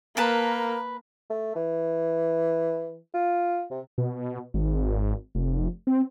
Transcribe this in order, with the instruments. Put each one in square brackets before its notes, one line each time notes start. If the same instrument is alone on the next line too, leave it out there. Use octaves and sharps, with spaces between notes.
[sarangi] A#3 [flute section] A#4 A#5 [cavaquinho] B4 A5 D#6
[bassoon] A3
E3
F4
C3
[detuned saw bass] B2
G#1
F1
C4